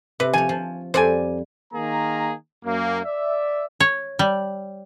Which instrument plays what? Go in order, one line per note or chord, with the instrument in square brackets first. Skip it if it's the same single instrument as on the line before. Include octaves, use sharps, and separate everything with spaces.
[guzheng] C3 [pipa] B4
[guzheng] F3 C#5 [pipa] G#5
[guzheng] F3
[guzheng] F2 G3 [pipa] C5 D5 G#5
[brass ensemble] D#3 A#3 G#4 A#5
F#2 A#3
D5 E5
[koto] C#5
G3